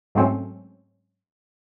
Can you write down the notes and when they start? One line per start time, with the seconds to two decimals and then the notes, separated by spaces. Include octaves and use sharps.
0.15 G#2 F#3 A3 C4 C#4